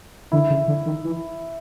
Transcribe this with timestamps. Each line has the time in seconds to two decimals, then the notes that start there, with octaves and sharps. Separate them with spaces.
0.32 D3 E4
0.50 C#3
0.68 D3
0.86 D#3
1.04 E3